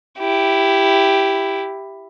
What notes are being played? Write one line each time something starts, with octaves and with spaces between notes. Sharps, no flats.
E4 G4